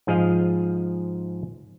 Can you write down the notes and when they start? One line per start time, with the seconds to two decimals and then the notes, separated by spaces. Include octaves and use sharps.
0.07 G#2 F3 G#4 D#5 F5